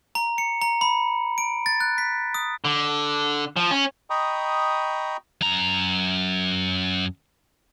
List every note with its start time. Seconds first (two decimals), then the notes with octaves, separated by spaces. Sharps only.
0.15 A#5
0.38 C#7
0.62 A#5
0.81 B5
1.38 D7
1.66 A6
1.80 F#6
1.98 B6
2.34 D#6
2.65 D3
3.56 F3
3.71 C#4
4.10 D#5 G5 A#5 B5 C#6 D#6
5.41 F#2 A#5